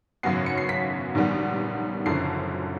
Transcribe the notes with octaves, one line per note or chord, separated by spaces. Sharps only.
G#1 F#2 C#3 F#3 B3 C7
C#7
C7
B6
A#1 G#2 D#3 G3 B3
F#1 F#2 D3 F3 C7